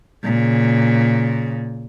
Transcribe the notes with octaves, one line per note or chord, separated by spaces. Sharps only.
A#2 C#3